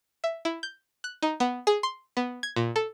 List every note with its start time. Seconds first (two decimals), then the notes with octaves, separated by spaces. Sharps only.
0.24 E5
0.45 E4
0.63 G6
1.04 F#6
1.23 D#4
1.40 B3
1.67 G#4
1.83 C6
2.17 B3
2.43 G#6
2.56 A#2
2.76 A4